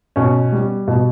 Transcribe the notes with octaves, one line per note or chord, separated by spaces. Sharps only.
B2 C#4 C#5
G3
B2